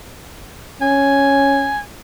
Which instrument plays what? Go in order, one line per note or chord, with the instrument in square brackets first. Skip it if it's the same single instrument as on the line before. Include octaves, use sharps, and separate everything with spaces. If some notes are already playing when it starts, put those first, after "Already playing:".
[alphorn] C#4 [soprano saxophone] G#5